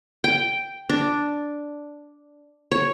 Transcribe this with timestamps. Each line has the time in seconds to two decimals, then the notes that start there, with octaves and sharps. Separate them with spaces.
0.24 G5
0.89 D4
2.71 C#5